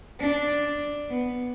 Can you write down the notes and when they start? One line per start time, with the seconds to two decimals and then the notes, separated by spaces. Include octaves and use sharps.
0.20 D4
1.09 B3